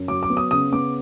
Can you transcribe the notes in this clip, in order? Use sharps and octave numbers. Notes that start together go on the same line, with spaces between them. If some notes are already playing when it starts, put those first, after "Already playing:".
Already playing: F#2
F#3 D6
D6
B3
D#6
C#3 D#6
B3 D6